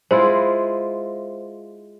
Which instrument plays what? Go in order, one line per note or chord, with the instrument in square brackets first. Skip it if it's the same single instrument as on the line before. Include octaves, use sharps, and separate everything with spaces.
[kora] G#3 E4 F4 [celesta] C5